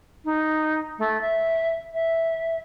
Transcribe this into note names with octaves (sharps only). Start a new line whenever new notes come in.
D#4
A3
E5
E5